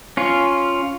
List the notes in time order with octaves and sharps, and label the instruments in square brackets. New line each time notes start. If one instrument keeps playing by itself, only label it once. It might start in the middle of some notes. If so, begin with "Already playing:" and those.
[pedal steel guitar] C#4 F4